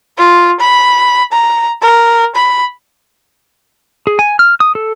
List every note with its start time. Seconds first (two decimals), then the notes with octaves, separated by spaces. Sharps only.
0.18 F4
0.61 B5
1.32 A#5
1.82 A#4
2.35 B5
4.07 G#4
4.19 G#5
4.39 F6
4.60 D#6
4.75 A4